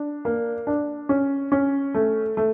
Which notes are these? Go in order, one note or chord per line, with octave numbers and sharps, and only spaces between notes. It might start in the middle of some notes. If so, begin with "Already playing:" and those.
Already playing: D4
A#3
D4
C#4
C#4
A3
A3